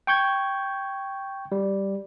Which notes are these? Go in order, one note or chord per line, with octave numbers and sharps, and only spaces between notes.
G5 C#6 G6 G#6
G3